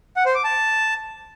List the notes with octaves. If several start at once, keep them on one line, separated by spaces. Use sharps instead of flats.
F#5
C5
D6
A5